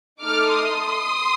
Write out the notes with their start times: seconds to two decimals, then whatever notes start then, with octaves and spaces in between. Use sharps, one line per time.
0.23 A3 D#4 A4 D6 F6
0.57 C6 D#6